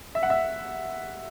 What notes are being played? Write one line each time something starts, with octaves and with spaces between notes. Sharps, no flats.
E5
F#5
E5